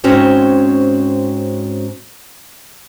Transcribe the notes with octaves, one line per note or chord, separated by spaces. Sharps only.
G#2 C4 C#4 F#4 C5 C#5